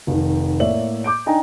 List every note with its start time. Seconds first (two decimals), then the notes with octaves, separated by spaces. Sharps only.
0.07 F1 D#3
0.60 A2 A#3 C#5 D5 E5 F#7
1.04 D6 G6 D7
1.26 D4 D#4 D#5 G5 G#5 A#5